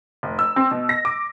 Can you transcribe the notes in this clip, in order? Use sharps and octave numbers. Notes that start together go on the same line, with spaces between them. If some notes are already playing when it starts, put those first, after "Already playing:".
F1
E6
C4
B2
A#6
D6